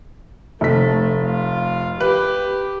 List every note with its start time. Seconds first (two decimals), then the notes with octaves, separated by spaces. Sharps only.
0.61 F1 A3 B6
1.22 F4
2.00 G4 B4